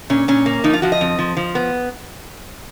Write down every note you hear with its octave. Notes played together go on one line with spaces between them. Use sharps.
A#2 C#4
A#2 C#4
A#3
F3 D#4
F4
F3 F#4
D#5
F2
F3
F3
B3